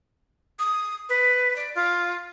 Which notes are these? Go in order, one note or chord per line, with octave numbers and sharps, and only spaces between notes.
D#6
B4
D5
F4